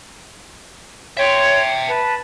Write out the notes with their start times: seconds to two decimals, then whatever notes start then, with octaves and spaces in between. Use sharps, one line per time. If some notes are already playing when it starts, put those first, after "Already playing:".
1.17 C#5 E5 G5 C6
1.88 B4 A5